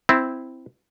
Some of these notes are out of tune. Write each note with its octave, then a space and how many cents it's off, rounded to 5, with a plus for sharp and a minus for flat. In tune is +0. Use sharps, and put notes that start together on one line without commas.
C4 -5 E4 +0